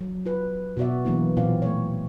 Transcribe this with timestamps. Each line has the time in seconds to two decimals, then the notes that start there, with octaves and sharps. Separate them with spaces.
0.01 F#3
0.26 F4 B4
0.77 B2 B3 F#4 D5 E5
1.05 E3 F#3 A#3 B3 D4 E4
1.37 A#2 E3 C4 F4 D5 F5
1.62 A3 C#5